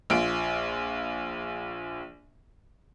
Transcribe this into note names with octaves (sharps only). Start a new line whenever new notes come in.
A#1 F4 D7